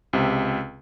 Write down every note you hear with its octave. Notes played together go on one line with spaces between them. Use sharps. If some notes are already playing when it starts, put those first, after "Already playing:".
C#2 C3